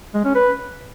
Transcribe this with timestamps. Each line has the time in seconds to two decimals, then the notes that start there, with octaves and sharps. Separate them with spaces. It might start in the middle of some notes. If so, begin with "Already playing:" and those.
0.14 G#3
0.25 C#4
0.35 B4